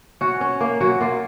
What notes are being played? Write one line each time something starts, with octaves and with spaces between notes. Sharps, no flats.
C#4 F#4
C#4
A#3
F#3 F#4
A#3 F4